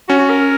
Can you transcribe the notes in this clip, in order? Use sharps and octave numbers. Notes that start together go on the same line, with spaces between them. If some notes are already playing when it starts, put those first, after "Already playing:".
C#4 F#4
F#4
A#4